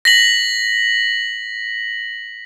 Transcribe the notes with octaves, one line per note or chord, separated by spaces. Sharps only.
A#6 B6 F#7